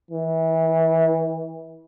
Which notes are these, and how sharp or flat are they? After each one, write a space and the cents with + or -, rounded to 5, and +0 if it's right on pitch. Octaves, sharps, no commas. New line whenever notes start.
E3 -25